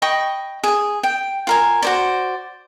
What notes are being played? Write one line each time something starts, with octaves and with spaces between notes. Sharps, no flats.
D#5 G5 B5 C#6
G#4 G#5
G5
F4 A#4 G#5
F#4 C5 D5